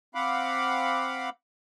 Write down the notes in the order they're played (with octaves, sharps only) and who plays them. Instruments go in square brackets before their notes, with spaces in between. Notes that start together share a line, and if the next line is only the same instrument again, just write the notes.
[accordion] C4 F5 F#5 B5 D6